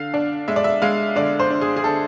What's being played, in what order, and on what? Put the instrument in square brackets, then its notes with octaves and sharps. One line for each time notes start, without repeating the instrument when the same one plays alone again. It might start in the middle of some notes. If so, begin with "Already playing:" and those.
Already playing: [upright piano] D3 F5
D4
G#3 E5
D5
E5
G#3 F5
D3 D5
C5
D4
G#4
G#4
D3 A4